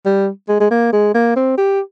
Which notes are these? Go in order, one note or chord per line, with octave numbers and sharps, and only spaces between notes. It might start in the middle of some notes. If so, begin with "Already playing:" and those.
G3
G#3
G#3
A#3
G#3
A#3
C4
G4